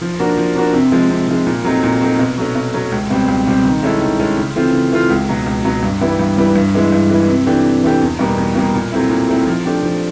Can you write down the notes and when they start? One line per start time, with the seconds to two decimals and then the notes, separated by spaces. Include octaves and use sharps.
0.01 F3
0.19 A#3 D4 F#4 A#4
0.37 F3
0.55 A#3 D4 F#4 A#4
0.73 C3
0.92 F3 G#3
1.10 C3
1.28 F3 G#3
1.47 A#2
1.65 F#3 A3 C4 D#4
1.83 A#2
2.01 F#3 A3 C4 D#4
2.19 B2
2.38 F#3 A3 C#4
2.55 B2
2.74 F#3 A3 C#4
2.92 C#2
3.10 B2 G3 C4
3.28 C#2
3.47 B2 G3 C4
3.65 D#3
3.83 G#3 C#4 E4 A4
4.01 D#3
4.19 G#3 C#4 E4 A4
4.37 C#3
4.56 E3 A3 C4 F4
4.74 C#3
4.92 E3 A3 C4 F4
5.10 C#2
5.29 B2 F#3
5.47 C#2
5.65 B2 F#3
5.83 G2
6.01 E3 G3 B3 E4
6.19 G2
6.37 E3 G3 B3 E4
6.56 G2
6.74 E3 G#3 B3 E4
6.92 G2
7.10 E3 G#3 B3 E4
7.29 C3
7.47 E3 A3 D4 G4
7.65 C3
7.83 E3 A3 D4 G4
8.01 E2
8.19 B2 G3 A#3
8.38 E2
8.55 B2 G3 A#3
8.74 A#2
8.92 F#3 A3 C4 E4
9.10 A#2
9.29 F#3 A3 C4 E4
9.47 F3
9.65 A3 D4 G4
9.83 F3